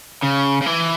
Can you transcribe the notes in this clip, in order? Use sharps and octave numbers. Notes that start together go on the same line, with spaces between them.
C#3
C#3
E3